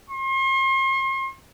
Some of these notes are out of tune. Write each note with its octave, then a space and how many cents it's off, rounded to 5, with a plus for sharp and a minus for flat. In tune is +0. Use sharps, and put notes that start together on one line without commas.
C6 +40